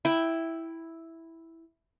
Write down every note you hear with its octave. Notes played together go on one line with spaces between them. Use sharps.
E4 G5